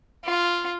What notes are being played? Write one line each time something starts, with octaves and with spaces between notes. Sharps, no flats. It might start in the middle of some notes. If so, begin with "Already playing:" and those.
F4